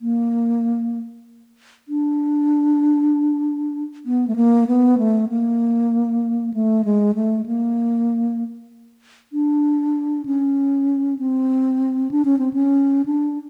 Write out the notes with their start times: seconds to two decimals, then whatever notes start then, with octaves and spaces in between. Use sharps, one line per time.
0.01 A#3
1.88 D4
4.06 B3
4.28 A3
4.36 A#3
4.67 B3
4.98 A3
5.29 A#3
6.54 A3
6.85 G#3
7.15 A3
7.46 A#3
9.33 D4
10.26 C#4
11.19 C4
12.11 D4
12.25 C#4
12.39 C4
12.53 C#4
13.06 D4